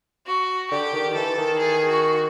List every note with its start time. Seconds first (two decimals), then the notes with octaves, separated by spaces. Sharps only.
0.26 F#4
0.70 D3 G4
0.93 D#3
1.11 D#3
1.15 E3 A4
1.38 D#3
1.59 G#4
1.89 F#4